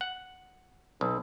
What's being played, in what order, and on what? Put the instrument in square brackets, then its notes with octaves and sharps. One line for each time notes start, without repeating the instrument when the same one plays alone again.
[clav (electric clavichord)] F#5
B1